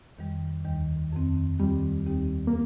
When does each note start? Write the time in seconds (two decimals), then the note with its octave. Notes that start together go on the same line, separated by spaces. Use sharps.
0.18 F2 D#3 G3
0.65 D#2 D#3 G3
1.12 F2 D#3 C4
1.59 D#2 D#3 G3 C4 F4
2.06 D#2 D#3 C4 D#4 G4
2.47 A#3